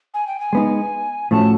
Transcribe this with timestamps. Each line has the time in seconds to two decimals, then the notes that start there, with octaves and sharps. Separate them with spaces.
0.14 G#5
0.27 G5
0.40 G#5
0.53 G#3 B3 D#4
1.31 A2 F3 A3 C#4 F#4 A5